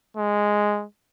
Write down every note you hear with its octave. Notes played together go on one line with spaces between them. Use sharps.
G#3